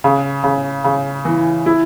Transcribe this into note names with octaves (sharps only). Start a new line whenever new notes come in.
C#3
C#3
C#3
E3
E4